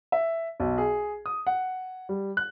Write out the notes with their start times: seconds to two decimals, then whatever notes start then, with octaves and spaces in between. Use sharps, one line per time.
0.12 E5
0.60 B1
0.78 G#4
1.26 D#6
1.47 F#5
2.09 G3
2.37 F#6